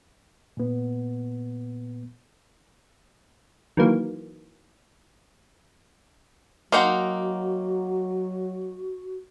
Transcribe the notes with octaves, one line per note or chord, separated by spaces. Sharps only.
A#2 B3
D#3 E3 F#3 A#3
F#3 A#3 D#4 F#4 F#5 G5 C6